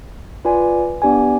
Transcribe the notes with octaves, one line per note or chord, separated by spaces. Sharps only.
F4 B4 D5 G#5
B3 D4 G4 D5 G#5